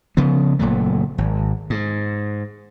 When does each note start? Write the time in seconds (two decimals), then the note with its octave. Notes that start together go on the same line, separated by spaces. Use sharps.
0.17 C#3 F3 B3
0.59 F#1 A#2 F#3 A3
1.18 G#1
1.70 G#2